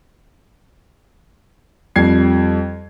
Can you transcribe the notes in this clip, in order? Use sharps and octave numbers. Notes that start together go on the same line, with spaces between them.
F2 G3 G#6 C7